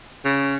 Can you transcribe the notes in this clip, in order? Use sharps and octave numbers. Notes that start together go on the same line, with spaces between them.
C#3